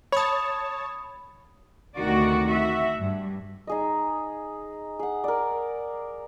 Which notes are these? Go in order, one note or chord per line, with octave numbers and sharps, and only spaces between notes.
C#5 A5 B5 D#6
D2 C3 D#3 F#4 A#4 D5
F#4 E5
G2
D#4 G#4 D#5
G#4 F#5
A#4 D5